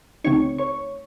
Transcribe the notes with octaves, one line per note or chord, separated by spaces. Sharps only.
C#2 C#3 A3 C4 D#4 C#5 C#6
C#5 C#6